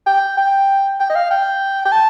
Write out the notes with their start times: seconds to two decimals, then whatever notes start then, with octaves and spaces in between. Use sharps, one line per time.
0.06 G5
0.37 G5
1.00 G5
1.10 D#5
1.15 F5
1.30 G5
1.85 G5
1.92 A5